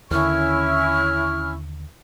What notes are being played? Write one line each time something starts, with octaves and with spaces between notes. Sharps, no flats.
D#2 D3 C#4 E4 C#6 F6